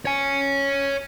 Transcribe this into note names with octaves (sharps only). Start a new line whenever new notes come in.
C#5 G#5